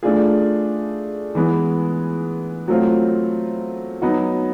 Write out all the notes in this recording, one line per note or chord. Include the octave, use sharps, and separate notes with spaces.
A3 D4 F4 G#4
E3 G#3 B3
F#3 A3 C4 F4
F#3 B3 D#4 F#4